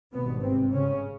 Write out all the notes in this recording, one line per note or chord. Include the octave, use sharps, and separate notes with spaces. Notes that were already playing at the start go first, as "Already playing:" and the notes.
G#1 G2 B2 B3
C3 C4
C#3 C#4